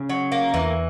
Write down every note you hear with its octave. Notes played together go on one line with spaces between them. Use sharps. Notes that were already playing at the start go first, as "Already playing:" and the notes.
Already playing: C#3
F#3
A#3
E2 E3